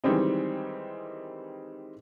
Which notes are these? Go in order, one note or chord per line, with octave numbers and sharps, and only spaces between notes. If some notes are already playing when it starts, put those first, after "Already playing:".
D#3 E3 G3 G#3 C4 D#4